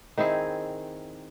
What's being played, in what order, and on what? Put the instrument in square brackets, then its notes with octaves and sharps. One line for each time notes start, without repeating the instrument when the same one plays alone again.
[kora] D#3 C4 E4 G#4